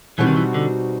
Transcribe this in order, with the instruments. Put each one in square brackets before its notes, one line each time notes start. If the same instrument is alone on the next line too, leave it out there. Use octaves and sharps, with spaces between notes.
[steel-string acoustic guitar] B2 G3 C4 D#4 F#4 [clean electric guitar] E3
[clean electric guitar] D#3
E3
D3